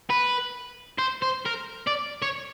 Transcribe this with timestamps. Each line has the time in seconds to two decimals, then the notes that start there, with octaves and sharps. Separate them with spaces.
0.10 B4
0.99 C5
1.22 C5
1.45 A#4
1.87 D5
2.22 C#5